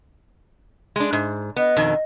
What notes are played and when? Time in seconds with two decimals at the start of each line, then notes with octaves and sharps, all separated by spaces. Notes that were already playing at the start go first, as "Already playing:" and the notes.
0.96 G#3 D4
1.13 G#2
1.56 B3 D#5
1.76 F2 B2 D#3